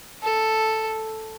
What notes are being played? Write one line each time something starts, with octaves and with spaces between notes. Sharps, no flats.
A4